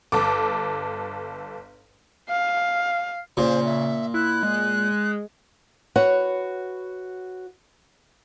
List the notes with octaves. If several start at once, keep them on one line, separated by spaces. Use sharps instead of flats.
G1 A4 D6
F5
A#2 C#3 C5
E5
E4 F#6
G#3
F#4 B4 C#5 F#5